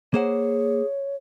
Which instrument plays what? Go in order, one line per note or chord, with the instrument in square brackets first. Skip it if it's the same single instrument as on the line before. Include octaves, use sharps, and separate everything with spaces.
[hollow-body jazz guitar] A#3 C5 F#5 [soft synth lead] G#4 [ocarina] C#5